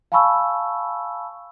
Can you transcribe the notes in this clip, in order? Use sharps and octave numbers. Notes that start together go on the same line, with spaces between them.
F5 G#5 A5 B5 C#6 E6